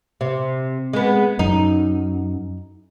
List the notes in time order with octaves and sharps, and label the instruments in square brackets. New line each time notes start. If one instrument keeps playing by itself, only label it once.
[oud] C3
G#3 B3
[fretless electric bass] F#2 [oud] D#4